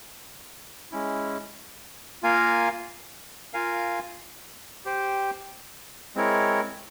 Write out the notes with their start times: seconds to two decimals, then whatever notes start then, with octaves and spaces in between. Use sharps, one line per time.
0.92 G#3 C#4 E4
2.23 A#3 F4 A#4 F5 G#5
3.53 F4 A#4 F5 G#5
4.85 G4 C5 G5
6.15 G#3 C4 E4 A#4 C#5